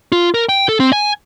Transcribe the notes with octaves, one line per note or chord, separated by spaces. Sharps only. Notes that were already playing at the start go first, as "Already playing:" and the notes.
F4
A#4
G5
A4
C4
G#5